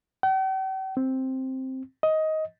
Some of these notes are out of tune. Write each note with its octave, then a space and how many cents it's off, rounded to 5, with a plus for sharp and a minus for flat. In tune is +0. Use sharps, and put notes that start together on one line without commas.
G5 -45
C4 +5
D#5 +15